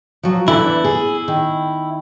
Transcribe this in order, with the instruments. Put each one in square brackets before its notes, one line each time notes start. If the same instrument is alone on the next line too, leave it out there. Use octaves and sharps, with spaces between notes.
[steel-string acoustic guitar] F3 F#3
[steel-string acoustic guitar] E2 D3 E3 [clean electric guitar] E4
[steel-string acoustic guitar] G#4
D#3